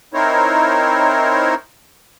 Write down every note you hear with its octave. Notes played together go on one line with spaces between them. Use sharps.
C4 D#4 E4 A#4 C5 C#5